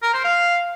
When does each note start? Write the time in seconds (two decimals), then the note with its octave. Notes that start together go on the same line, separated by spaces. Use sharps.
0.03 A#4
0.14 C5
0.24 F5